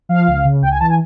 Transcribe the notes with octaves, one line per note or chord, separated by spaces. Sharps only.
F3 F5
C#2
C#3
C#2 G5
G#5
E3 A5
G#5